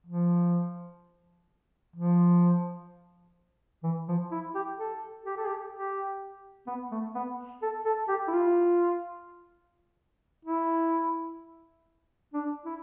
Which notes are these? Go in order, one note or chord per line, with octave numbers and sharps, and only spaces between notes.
F3
F3
E3
F3
E4
G4
A4
G4
A4
G4
G4
B3
A3
B3
A4
A4
G4
E4
F4
E4
D4
E4